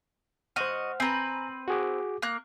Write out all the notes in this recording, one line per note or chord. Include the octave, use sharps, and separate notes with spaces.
F#4 C5 D#5 F#5 F6
C4 B4 G#5 A#5
F#4 G#4 D6
A#3 F#6